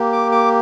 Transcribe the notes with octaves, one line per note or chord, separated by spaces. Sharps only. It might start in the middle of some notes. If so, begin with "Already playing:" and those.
Already playing: A#3 G4
D6
D6